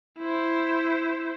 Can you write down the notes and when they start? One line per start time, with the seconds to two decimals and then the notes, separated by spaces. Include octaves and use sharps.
0.19 E4 C5